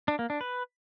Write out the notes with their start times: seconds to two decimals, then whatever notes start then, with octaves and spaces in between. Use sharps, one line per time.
0.08 D4
0.19 A#3
0.30 D4
0.41 B4